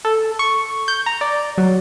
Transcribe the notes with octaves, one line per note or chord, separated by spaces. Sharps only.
A4
C#6
G6
A#5
D5
F#3